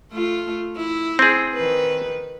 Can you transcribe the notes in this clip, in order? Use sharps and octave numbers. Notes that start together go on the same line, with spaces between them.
A3 F4
E4
C4 G#4
D#3 B4